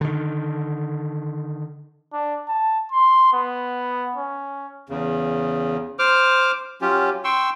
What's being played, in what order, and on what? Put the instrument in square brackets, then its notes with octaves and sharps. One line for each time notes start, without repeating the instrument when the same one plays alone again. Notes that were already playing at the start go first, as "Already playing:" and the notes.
[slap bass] D3 D#3
[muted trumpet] D4
A5
C6
B3
C#4
[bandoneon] E2 C#3
C5 D6 F6
F#3 C#4 F4 G4
G5 C6 C#6 E6